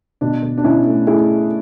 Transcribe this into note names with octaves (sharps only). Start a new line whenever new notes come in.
B2 D4
B2
D4
B2 C#4 E4
A3
A3 E4 G#4